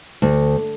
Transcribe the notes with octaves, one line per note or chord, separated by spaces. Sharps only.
D2